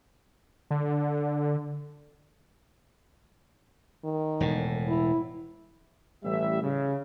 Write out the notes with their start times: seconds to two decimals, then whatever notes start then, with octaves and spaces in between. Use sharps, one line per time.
0.71 D3
4.04 D#3
4.40 E1 A2
4.88 E4
6.24 A1 G3 E5
6.62 C#3